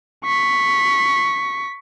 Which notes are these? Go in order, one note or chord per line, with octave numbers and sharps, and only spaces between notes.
C#6 B6